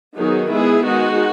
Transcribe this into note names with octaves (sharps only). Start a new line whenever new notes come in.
D#3 F#3 B3 D#4 G#4
G#3 B3 E4 G#4
D#3 G#3 D#4 F#4